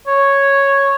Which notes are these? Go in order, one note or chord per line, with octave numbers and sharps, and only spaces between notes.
C#5